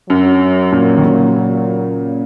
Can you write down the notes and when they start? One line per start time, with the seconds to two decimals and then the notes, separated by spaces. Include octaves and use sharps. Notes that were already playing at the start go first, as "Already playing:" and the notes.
0.09 F#2 F#3
0.72 F#2 A#2
0.97 D#3
1.05 A#2 C#3